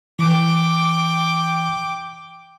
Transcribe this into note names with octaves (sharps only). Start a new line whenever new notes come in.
E3 G5 D6